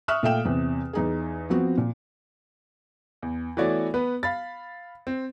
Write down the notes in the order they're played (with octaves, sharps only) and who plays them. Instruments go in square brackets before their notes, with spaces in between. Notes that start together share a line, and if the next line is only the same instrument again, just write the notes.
[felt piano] E5 C#6 D#6 F6 F#6
A#2 A3 E5 F5 G5 E7
E2 C3
E2 D#4 G#4
F3 B3 C4 F#4
A#2
[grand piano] E2
E3 A3 B3 F#4 C#5 D5
B3 B4
F5 B5 A6
C4